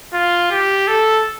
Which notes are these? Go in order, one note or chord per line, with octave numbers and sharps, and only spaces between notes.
F4
G4
A4